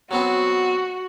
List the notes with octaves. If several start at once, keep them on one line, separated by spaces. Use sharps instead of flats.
F#3 B3 C4 F#4